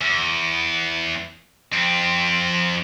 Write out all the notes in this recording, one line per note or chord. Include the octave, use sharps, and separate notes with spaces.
E2
F2 C4